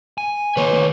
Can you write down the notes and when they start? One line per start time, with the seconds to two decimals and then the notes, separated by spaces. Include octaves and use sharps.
0.18 G#5
0.57 D#3 A#3 B4 C#5
0.73 D#3 A3